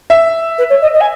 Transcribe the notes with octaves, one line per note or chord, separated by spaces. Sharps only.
E5
B4
C#5
D#5
D#5
G#5